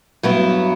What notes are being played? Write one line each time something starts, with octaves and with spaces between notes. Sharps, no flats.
G2 F#3 B3 E4